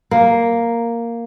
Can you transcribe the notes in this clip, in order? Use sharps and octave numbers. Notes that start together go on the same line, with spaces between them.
A#3